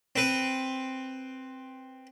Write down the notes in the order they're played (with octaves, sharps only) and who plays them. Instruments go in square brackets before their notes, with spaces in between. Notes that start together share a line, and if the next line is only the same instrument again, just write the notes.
[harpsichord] C4 B4